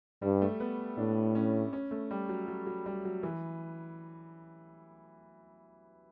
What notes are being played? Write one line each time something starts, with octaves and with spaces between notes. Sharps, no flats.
G2 G3
A3
B3
A2 D4
C#4
C#4
A3
G3
F#3
F#3
F#3
G3
F#3
E3